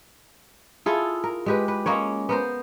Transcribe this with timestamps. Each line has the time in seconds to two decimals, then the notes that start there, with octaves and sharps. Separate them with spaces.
0.86 E4 F4 G#4 A4
1.24 A#4
1.46 G#3 G4 B4
1.68 B4
1.86 G#3 A#3 C#4 C#5
2.29 B3 A#4 C5